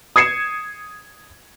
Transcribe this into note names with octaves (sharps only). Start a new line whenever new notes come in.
D#6 G#6 C7 C#7 E7